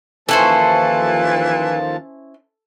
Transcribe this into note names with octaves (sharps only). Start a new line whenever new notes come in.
D#2 E3 F3 C#4 E4 A4 C5 A5